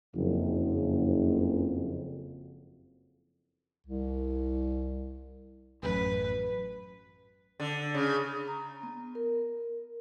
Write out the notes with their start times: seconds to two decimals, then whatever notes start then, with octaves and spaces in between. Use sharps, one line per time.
0.15 F#1 F2
3.86 C2
5.83 A1 F#2 B4
7.60 D3
7.94 C#3
8.48 A#5
8.83 B3
9.15 A#4